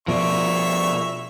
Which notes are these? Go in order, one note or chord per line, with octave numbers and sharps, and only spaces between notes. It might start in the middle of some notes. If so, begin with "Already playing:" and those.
B2 F3 A#4 D5 E5 C#6